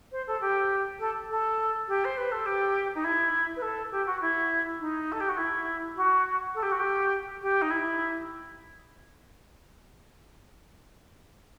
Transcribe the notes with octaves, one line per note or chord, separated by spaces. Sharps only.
C5
A4
G4
A4
A4
G4
C5
B4
A4
G4
D#4
E4
B4
A4
G4
F#4
E4
D#4
A4
G4
F#4
E4
F#4
A4
G4
F#4
G4
G4
D#4
E4